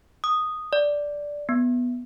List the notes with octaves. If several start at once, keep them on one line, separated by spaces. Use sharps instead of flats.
D#6
D5
B3